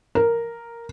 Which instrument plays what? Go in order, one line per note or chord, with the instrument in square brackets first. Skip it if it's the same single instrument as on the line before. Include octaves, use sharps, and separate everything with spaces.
[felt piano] A#4